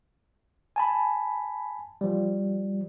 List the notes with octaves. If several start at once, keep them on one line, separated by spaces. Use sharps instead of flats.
G#5 A5 B5
F3 G3